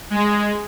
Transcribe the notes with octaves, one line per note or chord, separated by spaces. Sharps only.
G#3